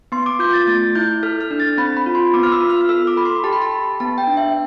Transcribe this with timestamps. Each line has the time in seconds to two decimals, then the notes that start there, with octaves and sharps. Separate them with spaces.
0.12 B3 C6
0.26 D6
0.39 F4 G6
0.53 A6
0.67 A3 A6
0.95 E4 G6
1.23 A4 F6
1.41 F6
1.51 D4
1.60 A6
1.77 C4 B5
1.97 B5
2.06 F4
2.15 C6
2.34 B3 D6
2.43 F6
2.52 E6
2.61 F4
2.70 F6
2.81 F6
2.89 A4 E6
3.07 D6
3.17 A4 B5
3.25 C6
3.44 G4 A5
3.53 B5
3.62 A5
3.71 G4
4.00 B3 A5
4.18 G5
4.27 D4
4.37 E5